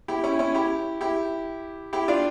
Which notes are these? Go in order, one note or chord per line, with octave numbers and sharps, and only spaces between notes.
E4 G4
C#4 E4
C#4 E4
E4 G4
E4 G4
E4 G4
D4 F4